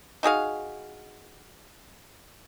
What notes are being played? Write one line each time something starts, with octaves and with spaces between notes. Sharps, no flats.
D#4 F#4 G#4 F5